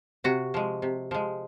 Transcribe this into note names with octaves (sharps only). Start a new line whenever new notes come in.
C3 F#4
F3 G#3
C3
F3 G#3